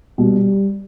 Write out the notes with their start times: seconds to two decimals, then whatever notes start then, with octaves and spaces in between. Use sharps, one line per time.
0.18 B2 G3